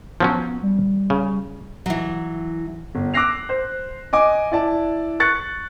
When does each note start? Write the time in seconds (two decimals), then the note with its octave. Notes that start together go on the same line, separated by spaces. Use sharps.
0.20 F3 F#3 B3 C#4
0.63 G3
1.10 C#3
1.86 E3 F#3
2.95 G1
3.14 D6 E6 F#6 A#6 C7 F7
3.49 C5
4.13 D#5 G#5 D6
4.51 E4 D5 A5
5.20 C#6 F#6 A6 C#7